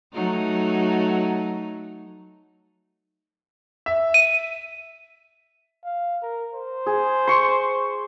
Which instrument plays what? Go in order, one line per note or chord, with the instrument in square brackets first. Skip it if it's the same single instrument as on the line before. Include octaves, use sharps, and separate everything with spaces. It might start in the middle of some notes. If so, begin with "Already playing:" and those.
[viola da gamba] F#3 A3 D#4
[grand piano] E5
[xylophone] D#7
[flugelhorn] F5
A#4
C5
[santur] G#4
C6 C#6